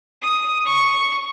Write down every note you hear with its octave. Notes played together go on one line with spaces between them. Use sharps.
D#6
C#6